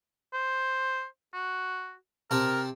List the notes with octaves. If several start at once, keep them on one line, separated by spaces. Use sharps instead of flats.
C5
F#4
C3 C4 A#4 A5